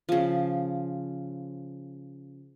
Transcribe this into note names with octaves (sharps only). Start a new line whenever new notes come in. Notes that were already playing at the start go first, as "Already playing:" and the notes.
C#3 F3